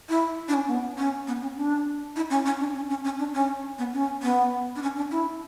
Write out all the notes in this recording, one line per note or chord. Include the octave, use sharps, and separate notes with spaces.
E4
D4
C#4
B3
C#4
B3
C#4
D4
E4
C#4
C#4
D4
C#4
C#4
C#4
D4
C#4
B3
C#4
B3
D4
C#4
D4
E4